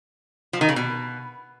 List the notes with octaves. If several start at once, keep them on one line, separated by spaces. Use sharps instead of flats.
F3
D#3
C#3
B2